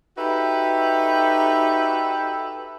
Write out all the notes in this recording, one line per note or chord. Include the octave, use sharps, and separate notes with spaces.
D#4 F#4 G4 A4 B4 E5